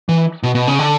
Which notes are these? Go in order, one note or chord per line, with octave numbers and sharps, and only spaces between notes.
E3
B2
B2
C#3
D3